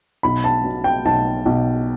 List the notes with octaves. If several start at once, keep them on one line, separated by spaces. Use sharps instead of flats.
B1 B5
A5
B2
G5
B1 A5
B1